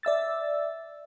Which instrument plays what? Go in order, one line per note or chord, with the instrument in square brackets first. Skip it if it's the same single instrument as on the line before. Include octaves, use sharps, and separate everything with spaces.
[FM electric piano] D5 E5 E6 A6